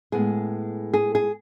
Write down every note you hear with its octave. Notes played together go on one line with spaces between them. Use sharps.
A2 G#3 B3 G#4
G#4
G#4